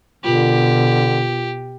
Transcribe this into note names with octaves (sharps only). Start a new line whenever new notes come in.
B2 D3 F4 G4 A#4 F#7